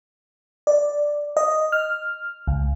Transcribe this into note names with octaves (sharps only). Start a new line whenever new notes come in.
D5
D#5
F6
C#2